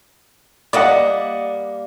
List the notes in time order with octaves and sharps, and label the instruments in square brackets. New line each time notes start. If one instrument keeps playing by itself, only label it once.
[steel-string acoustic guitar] G3 A#3 [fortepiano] D5 D#5 F#5